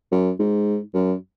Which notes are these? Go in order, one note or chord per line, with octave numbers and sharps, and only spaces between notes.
F#2
G#2
F#2